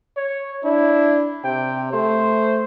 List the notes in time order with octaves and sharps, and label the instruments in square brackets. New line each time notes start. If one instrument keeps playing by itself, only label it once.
[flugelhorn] C#5
[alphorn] D4 [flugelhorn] E4
[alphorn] C3 [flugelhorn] G5
[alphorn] A3 [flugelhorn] C5